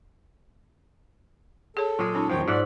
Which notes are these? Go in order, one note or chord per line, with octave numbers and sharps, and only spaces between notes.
G#4 A4 C#5
A#2 F#3 G#3 G#4
C#4 D#4 C#5
E2 D#3 F3 F#3 C#5 G5
G#2 D5 E5 F#5